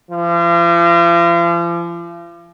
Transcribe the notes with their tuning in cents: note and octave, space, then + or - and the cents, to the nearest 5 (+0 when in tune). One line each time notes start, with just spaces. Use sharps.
F3 -40